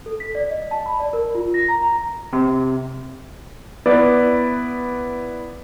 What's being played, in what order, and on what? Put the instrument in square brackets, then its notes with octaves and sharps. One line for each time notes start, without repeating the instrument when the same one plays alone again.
[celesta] A4
B6
D5
D#5
A5
B5
D5
A#4
F4
A#6
A#5
A#5
[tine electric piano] C3
[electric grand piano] B3 E4 B4 D5